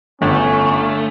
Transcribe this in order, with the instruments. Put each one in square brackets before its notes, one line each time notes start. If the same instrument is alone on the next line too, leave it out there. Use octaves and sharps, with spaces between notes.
[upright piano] G1 [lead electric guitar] A3 [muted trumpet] C#4